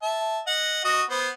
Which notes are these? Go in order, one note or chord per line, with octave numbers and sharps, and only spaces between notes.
E5 A5
D#5 F#5
F#4 D#5 D#6
B3 C5